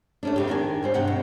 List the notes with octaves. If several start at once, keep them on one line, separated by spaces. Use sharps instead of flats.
A3 C#4 D4
F#2 C#3 G4
D#3 D4 G4 G#5
D#2 G3 C5
G2 C3 F#5 G5
B2